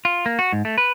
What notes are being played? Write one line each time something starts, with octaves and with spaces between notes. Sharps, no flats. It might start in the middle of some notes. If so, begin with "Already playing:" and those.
F4
A#3
F#4
G#2
A3
B4